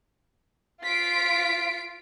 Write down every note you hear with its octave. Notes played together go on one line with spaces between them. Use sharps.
F4 B6 C7 D7